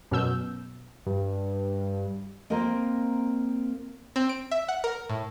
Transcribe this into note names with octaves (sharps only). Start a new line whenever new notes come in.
F#2 B2 E6 G6
G2
A#3 C4 F4 A#4 D#5
C4
D7
E5
F#5
A#4
A2